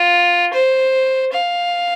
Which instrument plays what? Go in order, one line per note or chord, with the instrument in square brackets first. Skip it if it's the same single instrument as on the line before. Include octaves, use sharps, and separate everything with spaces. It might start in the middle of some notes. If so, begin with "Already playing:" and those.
Already playing: [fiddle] F4
C5
F5